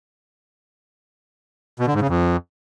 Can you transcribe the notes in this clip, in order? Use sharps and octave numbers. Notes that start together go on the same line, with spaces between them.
B2
D3
G#2
C#3
F2